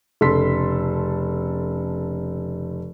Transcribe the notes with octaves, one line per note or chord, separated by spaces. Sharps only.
F1 C#3 A4 C6 B6